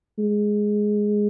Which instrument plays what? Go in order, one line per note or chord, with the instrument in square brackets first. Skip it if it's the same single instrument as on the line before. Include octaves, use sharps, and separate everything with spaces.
[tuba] G#3